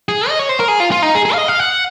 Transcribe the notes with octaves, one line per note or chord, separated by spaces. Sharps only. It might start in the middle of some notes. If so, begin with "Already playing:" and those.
G#4
D#5
C#5
C5
A#4
G#4
F4
F4
D#4
G#4
G#4
F5
D#5
F5
F#5